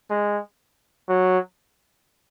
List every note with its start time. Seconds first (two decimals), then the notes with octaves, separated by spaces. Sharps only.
0.10 G#3
1.08 F#3